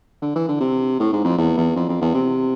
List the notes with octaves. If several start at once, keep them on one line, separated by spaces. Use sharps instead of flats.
D3
E3
D3
C3
A2
G#2
F2
E2
E2
F2
F2
E2
C3